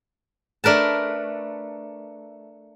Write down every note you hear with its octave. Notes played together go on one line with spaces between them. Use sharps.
A3 D4 A#4 B4 A5